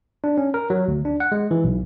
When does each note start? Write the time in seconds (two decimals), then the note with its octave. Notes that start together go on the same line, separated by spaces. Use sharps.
0.24 D4
0.38 C#4
0.54 A#4
0.70 F#3
0.88 D2
1.05 D4
1.20 F#5
1.32 G#3
1.51 E3
1.64 B1